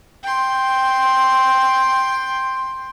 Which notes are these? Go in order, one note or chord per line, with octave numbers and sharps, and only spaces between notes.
G5 C6